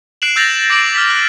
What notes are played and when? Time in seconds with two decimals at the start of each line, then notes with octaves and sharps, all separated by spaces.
0.22 F#6 C7 D7 E7 F#7
0.36 E6 G6 A6 A#6 F7 F#7
0.70 D6 A6 C7 D7 F#7
0.95 F6 A6 B6
1.10 F#6